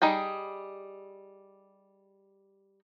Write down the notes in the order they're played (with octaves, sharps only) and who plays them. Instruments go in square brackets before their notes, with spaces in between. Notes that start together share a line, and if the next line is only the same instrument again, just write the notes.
[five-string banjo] G3 D#4 G#4 G5